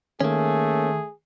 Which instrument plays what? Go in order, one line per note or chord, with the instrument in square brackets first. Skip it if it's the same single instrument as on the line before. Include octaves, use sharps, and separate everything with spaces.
[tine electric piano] D#3 [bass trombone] A3 [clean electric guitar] A#3 C#4 [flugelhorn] G#4